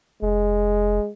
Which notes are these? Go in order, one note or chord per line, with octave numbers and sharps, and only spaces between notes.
F1 G#3